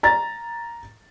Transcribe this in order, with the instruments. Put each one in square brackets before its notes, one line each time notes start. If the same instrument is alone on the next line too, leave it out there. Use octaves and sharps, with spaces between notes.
[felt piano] A#5 A6